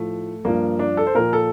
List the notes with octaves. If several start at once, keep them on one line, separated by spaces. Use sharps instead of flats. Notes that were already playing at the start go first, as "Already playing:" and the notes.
Already playing: A2 F3 A3
G2 F3 A#3
D4
A4
C5
A#2 F3 A#4
A4